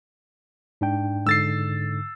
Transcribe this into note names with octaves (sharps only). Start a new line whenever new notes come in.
G#2 D4 G5
G#2 D3 E6 A6 C7